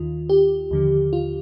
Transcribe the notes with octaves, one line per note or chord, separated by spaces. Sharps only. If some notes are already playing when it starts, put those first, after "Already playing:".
Already playing: D#2 D#3 F4
G4
D#2 D3 F3
F4